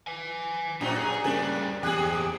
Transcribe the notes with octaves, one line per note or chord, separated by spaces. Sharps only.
B4 G#5
F2 A#2 D4 D#4 C5
G#4
G2 C#3 G3 A#3 D4 G#5
E2 C4 G4 G#4 G#5 F#6